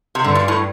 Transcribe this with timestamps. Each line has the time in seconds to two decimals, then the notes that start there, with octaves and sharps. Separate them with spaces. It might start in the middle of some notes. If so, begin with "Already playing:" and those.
0.15 C3
0.24 G2 D3
0.35 A#2
0.48 A2